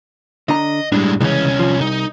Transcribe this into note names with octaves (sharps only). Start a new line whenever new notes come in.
D3 D4 D#5 A#5
A2 G3 G#3 D4
C2 C#3 E3 G#3 C#4
F3
C2 D#4